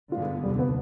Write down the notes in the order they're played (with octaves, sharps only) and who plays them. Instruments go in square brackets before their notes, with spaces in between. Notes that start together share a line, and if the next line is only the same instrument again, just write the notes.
[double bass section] G2 D3 G#3 B3 [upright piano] F4
[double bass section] F1 D#2 D3 [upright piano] G3
[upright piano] B3